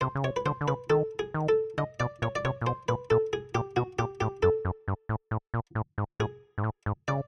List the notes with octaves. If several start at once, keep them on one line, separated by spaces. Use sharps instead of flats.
C3 C5
C#3
C3 C#5
B4
D3 C5
D3
C#3 B4
D#3 A4
G#4
D#3
A4
D3 D#5
B2 D5
A#2 C#5
D5
C3 C#5
A#2
B2 C5
A#2 B4
A#2 A4
G#4
A#2 G4
B2 F#4
A#2 G4
A2 G4
F#2 A4
F#2
G2
A2
A2
A#2
A2
G#2
A2 G#4
G#2
A2
G#2
C#3 D5